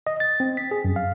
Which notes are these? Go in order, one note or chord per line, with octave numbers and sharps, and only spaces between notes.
D#5
A6
C4
B6
G#4
F#2
F5